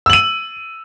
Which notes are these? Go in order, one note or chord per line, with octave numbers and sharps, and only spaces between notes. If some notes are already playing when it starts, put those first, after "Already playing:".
E6 D#7 F#7